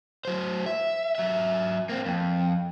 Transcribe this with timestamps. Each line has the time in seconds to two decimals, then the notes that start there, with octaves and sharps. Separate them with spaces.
0.25 F#3 C5
0.66 E5
1.15 F#3 E5
1.89 A#3 C4
2.06 F2